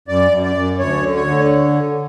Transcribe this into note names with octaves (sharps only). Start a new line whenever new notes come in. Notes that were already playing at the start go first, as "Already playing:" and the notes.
F#2 D5
F#2
D5
F#2
D2 C#5
D3
C#5
D3